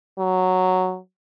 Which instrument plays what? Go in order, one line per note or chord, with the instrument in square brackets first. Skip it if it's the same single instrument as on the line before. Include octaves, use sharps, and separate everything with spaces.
[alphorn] F#3